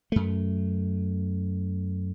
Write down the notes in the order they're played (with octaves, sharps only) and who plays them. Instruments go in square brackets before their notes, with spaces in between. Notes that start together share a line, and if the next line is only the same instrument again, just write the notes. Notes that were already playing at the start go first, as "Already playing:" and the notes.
[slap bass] F#2 A3